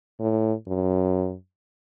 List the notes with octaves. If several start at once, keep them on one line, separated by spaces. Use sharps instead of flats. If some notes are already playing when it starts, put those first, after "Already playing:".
A2
F#2